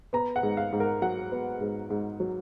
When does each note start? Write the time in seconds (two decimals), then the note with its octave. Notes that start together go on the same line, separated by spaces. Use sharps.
0.13 B3 A#5
0.36 F#5
0.43 G#2
0.57 F5
0.72 G#2
0.80 A#4
1.02 F#3 F#5
1.32 B3
1.61 G#2
1.90 G#2
2.20 F#3